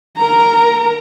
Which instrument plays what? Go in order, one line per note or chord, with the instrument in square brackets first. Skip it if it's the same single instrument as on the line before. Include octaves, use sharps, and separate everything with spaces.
[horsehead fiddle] A#4 A#5